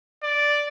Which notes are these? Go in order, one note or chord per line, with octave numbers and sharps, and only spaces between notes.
D5